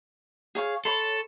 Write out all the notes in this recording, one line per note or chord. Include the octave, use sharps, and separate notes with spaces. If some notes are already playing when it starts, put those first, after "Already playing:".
G#4 C#5 F5
A4 C#5 B5 C6